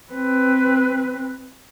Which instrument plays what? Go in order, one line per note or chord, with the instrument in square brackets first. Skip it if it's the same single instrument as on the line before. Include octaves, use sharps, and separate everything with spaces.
[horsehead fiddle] C4 B4